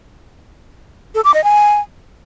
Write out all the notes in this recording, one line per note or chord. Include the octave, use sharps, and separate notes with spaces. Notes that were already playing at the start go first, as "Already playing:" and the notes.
A4
D6
D#5
G#5